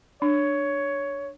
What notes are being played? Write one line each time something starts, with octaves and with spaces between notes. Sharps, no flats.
D4 C#5